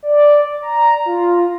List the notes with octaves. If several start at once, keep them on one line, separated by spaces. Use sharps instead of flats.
D5
A#5
F4